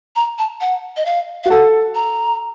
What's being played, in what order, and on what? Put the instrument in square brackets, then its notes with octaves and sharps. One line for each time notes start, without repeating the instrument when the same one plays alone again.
[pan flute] A#5
A5
F#5
D#5
F5
[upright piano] F#4 [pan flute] F5
[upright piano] A4 [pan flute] F#5
[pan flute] A#5